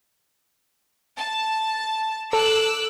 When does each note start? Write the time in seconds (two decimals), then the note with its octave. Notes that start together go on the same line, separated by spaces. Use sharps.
1.18 A5
2.33 A4 D6 E6 F#6